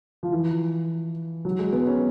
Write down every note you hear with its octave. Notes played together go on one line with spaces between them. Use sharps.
F3
E3
F#3
G#3
B3
C#4